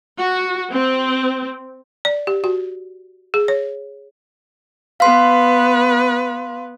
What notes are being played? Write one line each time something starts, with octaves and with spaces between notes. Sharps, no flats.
F#4
C4
D5
G4
F#4
G#4
C#5
B3 B4 F5 C6